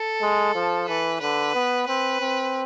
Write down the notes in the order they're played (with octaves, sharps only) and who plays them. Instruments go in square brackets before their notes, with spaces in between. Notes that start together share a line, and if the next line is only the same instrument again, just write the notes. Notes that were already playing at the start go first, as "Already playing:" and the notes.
Already playing: [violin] A4
[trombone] G#3
F3
[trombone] E3 [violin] B4
[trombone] D3 [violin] B4
[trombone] B3
[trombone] C4 [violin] B4
[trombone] C4